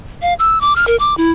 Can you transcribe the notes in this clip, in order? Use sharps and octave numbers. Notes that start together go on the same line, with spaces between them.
F5
E6
D6
F6
A#4
D6
E4